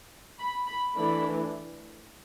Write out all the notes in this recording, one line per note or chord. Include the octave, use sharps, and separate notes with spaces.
B5
B5
E3 A3 D4 B5